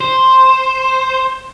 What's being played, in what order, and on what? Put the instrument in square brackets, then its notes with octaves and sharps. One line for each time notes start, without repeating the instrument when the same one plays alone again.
[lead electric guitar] C5